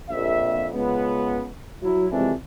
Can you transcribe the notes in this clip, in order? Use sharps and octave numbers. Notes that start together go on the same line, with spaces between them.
A#1 F2 E5
C#2 B3
F#3 E4
F2 C3 E3 G#3 A3 D4